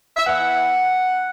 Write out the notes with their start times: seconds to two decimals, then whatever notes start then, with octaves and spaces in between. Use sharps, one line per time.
0.17 E5
0.27 E3 B3 E4 F#5